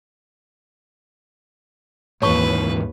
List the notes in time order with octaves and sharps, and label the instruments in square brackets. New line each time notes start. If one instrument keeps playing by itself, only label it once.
[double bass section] D#2 [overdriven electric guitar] G#2 E3 [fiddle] B4 [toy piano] C#5 A5 C#6